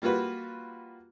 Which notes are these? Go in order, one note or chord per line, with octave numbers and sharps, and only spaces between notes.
G3 A#3 F4 F#4 B4